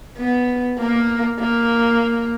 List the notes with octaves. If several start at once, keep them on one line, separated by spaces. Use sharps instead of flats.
B3
A#3
A#3